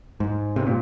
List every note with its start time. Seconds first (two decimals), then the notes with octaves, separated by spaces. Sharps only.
0.20 G#2
0.56 C3
0.67 A#2